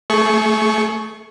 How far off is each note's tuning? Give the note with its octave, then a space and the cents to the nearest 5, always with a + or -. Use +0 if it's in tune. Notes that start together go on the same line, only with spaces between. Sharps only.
A3 +10 G#4 +40 C#6 +0